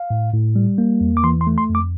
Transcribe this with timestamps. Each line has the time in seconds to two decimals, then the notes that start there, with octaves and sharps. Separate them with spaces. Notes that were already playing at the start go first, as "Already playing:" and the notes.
Already playing: F5
0.10 A2
0.33 A2
0.56 G3
0.78 A#3
1.01 E2
1.17 D6
1.24 E3 C6
1.41 C6
1.47 A3
1.58 C6
1.70 F2
1.75 D6